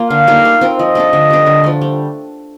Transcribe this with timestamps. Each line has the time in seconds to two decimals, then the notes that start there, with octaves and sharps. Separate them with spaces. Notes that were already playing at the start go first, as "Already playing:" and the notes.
Already playing: A#3 F4
0.10 D3 F5
0.27 G3 A#3 D#4
0.45 A3
0.61 C4 F4 A#4
0.79 F3 D#5
0.95 A3 D4 A4
1.13 D3
1.30 G3 D4
1.46 D3
1.64 F3 A3
1.81 G3